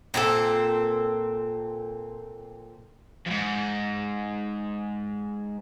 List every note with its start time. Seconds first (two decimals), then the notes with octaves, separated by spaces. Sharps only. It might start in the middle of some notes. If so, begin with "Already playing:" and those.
0.14 A#2 C4 F#4 A4
3.26 F2 G#2